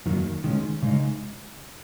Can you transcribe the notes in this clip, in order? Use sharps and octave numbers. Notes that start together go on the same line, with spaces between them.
F#2 D#3 F#3 A#3
D#3 G#3 C#4
C#3 G#3 D#4